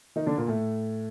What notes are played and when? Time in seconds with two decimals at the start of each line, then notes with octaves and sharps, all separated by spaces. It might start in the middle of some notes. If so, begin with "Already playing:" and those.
0.16 D#3 D#4
0.26 D3 D4
0.37 A#2 A#3
0.48 A2 A3